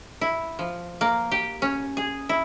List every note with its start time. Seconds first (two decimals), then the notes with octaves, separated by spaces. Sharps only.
0.21 E4
0.59 F3
1.01 A#3
1.31 G4
1.62 C#4
1.97 G#4
2.29 E4